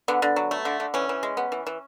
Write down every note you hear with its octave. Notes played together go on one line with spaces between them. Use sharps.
D3 B3
D3
F#3
A3
D3
D3
E3 C#4
E3
G#3
B3
E3
E3